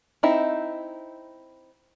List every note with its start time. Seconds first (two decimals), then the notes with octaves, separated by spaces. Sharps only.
0.23 C4 D#4 E4